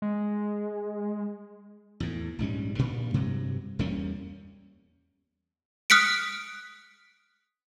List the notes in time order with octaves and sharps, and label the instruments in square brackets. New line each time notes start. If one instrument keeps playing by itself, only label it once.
[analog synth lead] G#3
[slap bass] E2 A2
A#1 G#2 G3 C#4
G2 A#2
G2 C3 F#3
E2 G3 A#3 C#4
[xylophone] D#6 F6 F#6 B6 C#7 D7